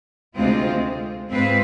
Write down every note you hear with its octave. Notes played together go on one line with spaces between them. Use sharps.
D2 C3 G#3 C4 F4
G#2 G#3 C4 F4 B4